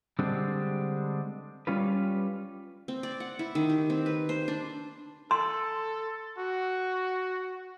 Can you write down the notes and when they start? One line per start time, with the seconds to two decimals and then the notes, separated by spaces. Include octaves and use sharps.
0.19 D3 G3 G#3 C4 D4
1.67 G3 C#4 F4 B4
2.88 C4
3.03 D5
3.20 F#5
3.39 E4
3.55 D#3
3.70 G4
3.90 C4
4.06 B4
4.29 C5
4.48 D4
5.31 A4 C6
6.38 F#4